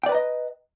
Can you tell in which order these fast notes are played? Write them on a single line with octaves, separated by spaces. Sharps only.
G5 D5 B4 A#5 D#5